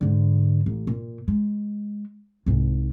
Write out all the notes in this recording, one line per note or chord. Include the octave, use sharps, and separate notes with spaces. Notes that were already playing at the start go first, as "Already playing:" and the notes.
G#2 D3
A1
A#2
G#3
C2 G#2